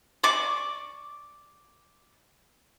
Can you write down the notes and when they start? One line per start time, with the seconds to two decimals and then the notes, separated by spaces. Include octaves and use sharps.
0.23 D5 C#6 D6